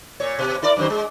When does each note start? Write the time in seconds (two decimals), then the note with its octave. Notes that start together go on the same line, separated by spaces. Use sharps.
0.20 A#2 C#5
0.39 B2
0.62 E4 A#4 D5
0.77 F#2 D#3 C5
0.90 G#3